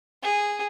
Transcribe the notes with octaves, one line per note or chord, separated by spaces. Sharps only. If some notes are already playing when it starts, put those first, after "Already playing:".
G#4